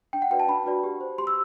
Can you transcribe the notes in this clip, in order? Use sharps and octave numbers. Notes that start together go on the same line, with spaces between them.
D4 G5
F#5
F#4 B4 D5 G5
A5
D4 B5
F#4 B4 D5
G4
C5
G4 C6
E6